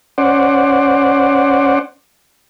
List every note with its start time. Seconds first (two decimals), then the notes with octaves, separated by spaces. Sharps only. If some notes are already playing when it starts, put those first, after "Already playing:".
0.18 C#4 C5 D5 F#5